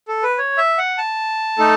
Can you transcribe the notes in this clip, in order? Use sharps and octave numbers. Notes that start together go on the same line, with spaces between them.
A4
B4
C#5
E5
F#5
A5
A3 D#4 A4